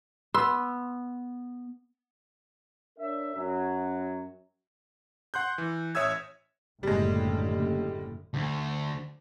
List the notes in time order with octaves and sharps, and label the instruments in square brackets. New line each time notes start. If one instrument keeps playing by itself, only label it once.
[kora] B3 [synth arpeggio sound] C6 E6
[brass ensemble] D4 A#4 C#5 E5
F#2 F#3
[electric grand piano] F#5 C6 F#6 G6
E3
A1 C#5 E5 D#6 E6 G#6
[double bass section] F#1 A2 D3 [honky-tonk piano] G3 G#3
[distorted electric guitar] D2 D3